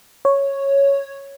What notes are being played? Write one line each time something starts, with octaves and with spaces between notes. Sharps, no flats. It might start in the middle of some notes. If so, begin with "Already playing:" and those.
C#5